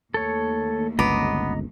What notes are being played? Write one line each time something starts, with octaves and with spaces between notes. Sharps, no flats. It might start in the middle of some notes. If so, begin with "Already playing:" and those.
D#2 A3 A4 C#5
G1 C#2 B3 D#5 A#5 D6